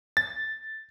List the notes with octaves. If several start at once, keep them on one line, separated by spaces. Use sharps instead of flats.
A6